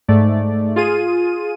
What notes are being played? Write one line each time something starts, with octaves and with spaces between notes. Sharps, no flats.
G#2 A3 D5
F4 G#4 D#7